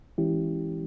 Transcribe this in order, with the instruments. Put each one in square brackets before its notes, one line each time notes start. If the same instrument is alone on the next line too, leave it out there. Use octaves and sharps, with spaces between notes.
[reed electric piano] E3 G#3 C#4 E4 G4